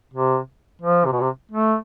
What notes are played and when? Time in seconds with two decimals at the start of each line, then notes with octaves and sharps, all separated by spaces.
0.14 C3
0.82 F3
1.06 C3
1.13 B2
1.21 C3
1.52 A3